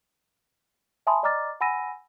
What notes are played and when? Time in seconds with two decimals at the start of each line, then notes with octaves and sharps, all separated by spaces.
1.07 E5 G#5 A5 B5 C6 D#6
1.23 D5 D#5 A#5 D6 F6 A6
1.61 F#5 G#5 B5 E6 A#6 D#7